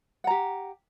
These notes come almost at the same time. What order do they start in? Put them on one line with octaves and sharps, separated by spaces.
F#5 A#5 G4